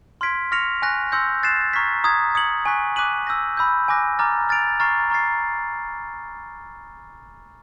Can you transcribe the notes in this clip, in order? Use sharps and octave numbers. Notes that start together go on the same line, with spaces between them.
C6 F6 G#6 B6 D7
C#6 F6 A#6 C#7 F7
G#5 C#6 F#6 A#6
C6 E6 G6 A#6 C#7
D#6 F#6 A6 C7 E7
A#5 C#6 F6 G#6 B6
A#5 D#6 G#6
D#6 G#6 C#7 F#7
G#5 C#6 F#6 B6
D6 F#6 B6 D#7 F#7
E6 G6 A#6
B5 E6 G6
G#5 B5 D6 F#6 A#6
A#5 D6 F6 A6
F6 A6 D7 F7
A#5 C#6 F6 A6 C7
A#5 C#6 F6 A6 C7